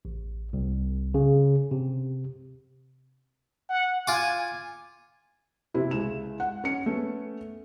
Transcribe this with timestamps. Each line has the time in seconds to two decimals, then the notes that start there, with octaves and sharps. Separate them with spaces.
0.05 A1
0.53 C2
1.14 C#3
1.71 C3
3.69 F#5
4.07 F4 G#5 D6
5.74 C3 E4
5.91 C#2 E4 E7
6.40 F#5
6.64 C#4 C#7
6.86 A3 B3 C#4